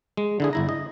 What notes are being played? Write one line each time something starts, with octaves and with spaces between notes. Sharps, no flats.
G#3
D3 E4 G#4
G1 E4 A#5
D#5